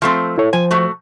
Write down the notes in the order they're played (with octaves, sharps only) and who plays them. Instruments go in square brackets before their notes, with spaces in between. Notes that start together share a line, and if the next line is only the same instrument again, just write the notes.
[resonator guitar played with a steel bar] F3 A3 C4
[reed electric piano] E4 A4 C#5
[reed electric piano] F3 C5 [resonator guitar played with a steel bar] G#5
[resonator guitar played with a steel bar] A3 F#4